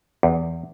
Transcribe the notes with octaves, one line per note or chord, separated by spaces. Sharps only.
E2